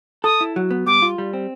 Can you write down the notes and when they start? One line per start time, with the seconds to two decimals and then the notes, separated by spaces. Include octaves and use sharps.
0.24 A4 D#6
0.41 E4
0.56 F#3
0.71 B3
0.87 G3 D6
1.02 F4
1.18 G3
1.33 C4